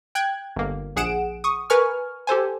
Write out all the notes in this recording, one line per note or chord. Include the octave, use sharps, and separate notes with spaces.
G5 F#6 G#6
G1 A#3
A#1 G#4 F#5 D7 E7
C#6 D#6
A#4 B4 G#5 C#6 F6
G4 A4 C5 G#5